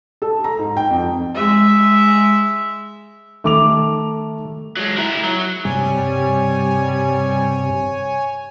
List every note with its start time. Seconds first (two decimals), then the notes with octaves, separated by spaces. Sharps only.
0.22 A4
0.44 A#5
0.59 G#2
0.77 G5
0.91 F2
1.35 G#3 E5
3.44 D#3 A3 A4 D6 F7
4.77 F#3 G#3
4.97 E4 A#4
5.24 F#3
5.65 G2 C3 G3 C#5 G#5